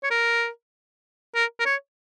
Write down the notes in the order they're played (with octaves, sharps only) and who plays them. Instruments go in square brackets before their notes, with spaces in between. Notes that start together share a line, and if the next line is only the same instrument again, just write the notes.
[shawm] C#5
A#4
A#4
A#4
C#5